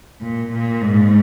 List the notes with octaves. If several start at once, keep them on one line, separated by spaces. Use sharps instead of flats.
A#2
A#2
G#2